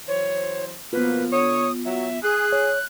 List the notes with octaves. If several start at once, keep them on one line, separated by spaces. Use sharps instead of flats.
E3 F#3 C5 C#5
B2 F3 A#3 B3 F4 B4
D3 C#5 D#6
F#3 E5
G#4 F#6
C#5